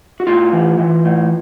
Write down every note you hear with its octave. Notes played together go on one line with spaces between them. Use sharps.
F#4
A2 F4
E3
E3
A2